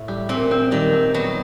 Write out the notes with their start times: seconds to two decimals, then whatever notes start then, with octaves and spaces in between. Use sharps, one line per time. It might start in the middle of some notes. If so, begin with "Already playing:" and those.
Already playing: A2
0.08 G3
0.29 A#2 C4
0.51 C4
0.71 D#3 G3
0.93 C4
1.14 F#3 B3